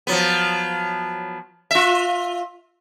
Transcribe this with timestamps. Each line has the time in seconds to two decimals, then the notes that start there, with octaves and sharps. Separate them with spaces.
0.07 F3 F#3 B3
1.71 F4 E5